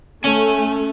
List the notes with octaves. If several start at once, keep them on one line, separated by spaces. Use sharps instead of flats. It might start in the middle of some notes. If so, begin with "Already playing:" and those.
A3 C#4 G#5